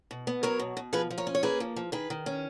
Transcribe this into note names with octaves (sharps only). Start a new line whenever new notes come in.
B2
B3
F#3 A#4 C#5
B2
B2
F3 G#4 B4
F3
A#4 C#5
C#4
C#5
A#3 G#4 B4
F3
F3
D#3 G#4 B4
D#3
C#4